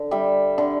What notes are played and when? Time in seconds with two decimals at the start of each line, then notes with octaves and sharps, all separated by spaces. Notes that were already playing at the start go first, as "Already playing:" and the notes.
Already playing: D3
0.11 G3 E5
0.58 D3